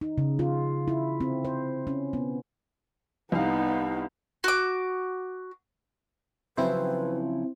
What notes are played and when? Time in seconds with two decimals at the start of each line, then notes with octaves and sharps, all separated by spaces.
0.01 D#4
0.18 C#3
0.39 F4
0.88 E4
1.21 C4
1.45 C5
1.87 C#4
2.13 B3
3.32 C2 B3 D#4 F5
4.44 F#4 D6
6.57 C#3 F3 F#3 C4 E4 B4 C5